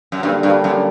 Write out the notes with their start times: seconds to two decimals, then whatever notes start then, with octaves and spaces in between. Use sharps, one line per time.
0.12 F#2
0.23 G2 D3 G3 A#3 D4
0.43 G2
0.64 F#2